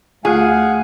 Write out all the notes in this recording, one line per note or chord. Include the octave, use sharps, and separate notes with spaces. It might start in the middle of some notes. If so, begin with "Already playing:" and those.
D2 A3 F4 G#4 F5 F#5 G#5